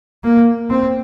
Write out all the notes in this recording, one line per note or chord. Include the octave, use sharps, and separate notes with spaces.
A#3
C4